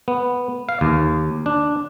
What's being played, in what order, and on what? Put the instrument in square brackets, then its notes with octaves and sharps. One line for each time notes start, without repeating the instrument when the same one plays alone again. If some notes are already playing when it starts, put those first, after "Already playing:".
[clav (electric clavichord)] B3
F5
D#2
D4